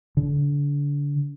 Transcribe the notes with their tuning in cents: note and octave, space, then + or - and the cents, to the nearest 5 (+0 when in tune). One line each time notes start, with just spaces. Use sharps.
D3 -30